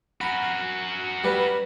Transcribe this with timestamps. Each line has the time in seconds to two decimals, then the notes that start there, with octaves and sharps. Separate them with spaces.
0.21 F#4 A#4 B5
1.24 G3 B4